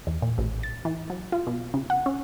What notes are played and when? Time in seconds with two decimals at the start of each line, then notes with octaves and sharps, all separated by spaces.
0.07 E2
0.22 A#2
0.38 A1
0.63 A6
0.85 E3
1.10 F#3
1.32 F4
1.47 B2
1.74 C#3
1.90 F#5
2.06 C#4